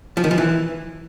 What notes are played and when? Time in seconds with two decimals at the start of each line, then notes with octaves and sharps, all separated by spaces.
0.17 F3
0.24 D#3
0.31 F3
0.38 E3